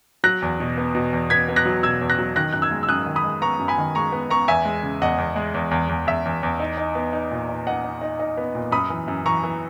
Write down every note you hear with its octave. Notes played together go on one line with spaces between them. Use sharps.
F#3 F#6 A#6
E2
B2
B3
B2
E2
B3 G#6 B6
B3
F#6 A#6
F#3
B2 E6 G#6
E2
F#6 A#6
F#3
D#3 F#6 A#6
F#2 F#6
E6 G#6
G#3
E6
F#2 D#6 F#6
D#3
B5 D#6
G#3
B3 A#5 C#6
F#2
G#5 B5
D#3
G#3 A#5 C#6
B3
B3 A#5 C#6
E2 E5 G#5
G#3
C#3
E2 D#5 F#5
E2
G#3
E2
E2
E2
E2 E5
E2
E2
D#4
D#4
B3
D#4
A#2
D#4
D#4 D#5 F#5
D#4
D#4
D#4
B3
A#2
F#2 B5 D#6
E3
F#2
E3 A#5 C#6
E3